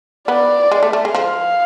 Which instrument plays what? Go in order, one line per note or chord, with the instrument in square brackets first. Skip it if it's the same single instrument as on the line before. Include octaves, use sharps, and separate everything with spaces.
[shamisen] B3 [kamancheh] D5
[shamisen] G#3
A3
A3
G#3
[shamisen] F3 [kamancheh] F5